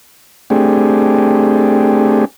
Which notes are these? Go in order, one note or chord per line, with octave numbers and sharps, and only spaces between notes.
A3 C4 D4 G4 G#4